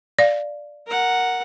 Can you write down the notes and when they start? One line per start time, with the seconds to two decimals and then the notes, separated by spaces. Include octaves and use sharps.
0.19 D5 F5
0.87 A#4 F#5